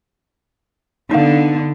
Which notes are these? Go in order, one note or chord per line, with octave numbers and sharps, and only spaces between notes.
D3 B3 D#4 F5